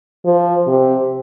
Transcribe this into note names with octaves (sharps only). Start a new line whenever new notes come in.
F3
C3